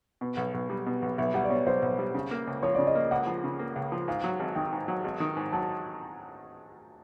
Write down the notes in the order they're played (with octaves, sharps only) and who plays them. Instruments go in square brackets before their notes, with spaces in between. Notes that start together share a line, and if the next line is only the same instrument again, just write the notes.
[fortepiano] B2
B1
B1
G3
B2
B1
[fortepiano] B1 [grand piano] E5
[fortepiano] G3 [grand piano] F#5
[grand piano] D5
[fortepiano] B2 [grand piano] C#5
[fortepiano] B1 [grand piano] C5
[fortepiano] B1
G3
C#3
A#3
C#2
[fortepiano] F3 [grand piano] C#5
[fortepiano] C#3 [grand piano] D5
[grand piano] D#5
[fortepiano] A#3
[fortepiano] C#2 [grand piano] F#5
[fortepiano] F3
C#3
A#3
C#2
F3
[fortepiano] G#2 [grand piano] F5
[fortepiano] F#3
G#1
[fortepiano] D#3 [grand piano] G5
[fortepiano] G#2
F#3
G#1
D#3
G#2
[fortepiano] F#3 [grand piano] A5